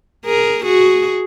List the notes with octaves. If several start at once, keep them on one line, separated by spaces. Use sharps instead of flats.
G#4 A#4
F#4 G#4